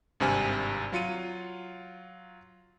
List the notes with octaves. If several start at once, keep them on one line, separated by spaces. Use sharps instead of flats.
G#1 G2 C3 G#5 F6
F#3 F4 C#7 D#7